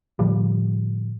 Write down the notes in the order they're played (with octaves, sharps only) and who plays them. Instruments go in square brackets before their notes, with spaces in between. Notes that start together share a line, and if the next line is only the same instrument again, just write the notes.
[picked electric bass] A2 D3 F3 G3